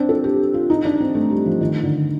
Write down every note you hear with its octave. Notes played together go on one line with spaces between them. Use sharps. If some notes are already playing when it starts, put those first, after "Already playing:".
Already playing: C4 D4
A4
G4
F4
D#4
D4
C4
A3
G3
F3
D#3
D3